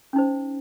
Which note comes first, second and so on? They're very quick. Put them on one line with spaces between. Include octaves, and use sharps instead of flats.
C#4 D#4 C5